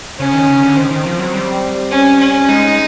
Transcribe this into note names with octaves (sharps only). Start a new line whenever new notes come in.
C#3 C#4
D#3
C#3
D3
D#3 C4
D#3
F3
F#3
G3
C#4
C#4
G#3 D#4